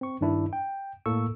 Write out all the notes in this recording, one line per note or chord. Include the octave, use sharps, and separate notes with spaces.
C4 C#6
G2 D#3 D4 E4
G5
A2 A#3 A4 C#6 E6